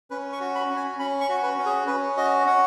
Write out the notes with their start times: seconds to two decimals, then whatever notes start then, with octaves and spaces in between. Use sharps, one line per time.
0.11 C#4 B4
0.32 C#6
0.40 F#4
0.55 B5
0.70 C#4
0.76 G#5
0.99 C#4 B5
1.21 C#6
1.29 F#4
1.43 B4
1.59 C#4
1.66 G#4
1.87 C#4 B4
2.17 F#4 D#5
2.47 C#4 F#5